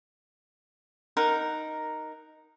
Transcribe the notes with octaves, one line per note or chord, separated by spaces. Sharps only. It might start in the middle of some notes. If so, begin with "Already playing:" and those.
D#4 A#4 F#5